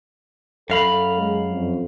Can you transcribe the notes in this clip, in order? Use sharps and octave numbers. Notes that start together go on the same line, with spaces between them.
F#2 A4 F5 B5
G#3
F2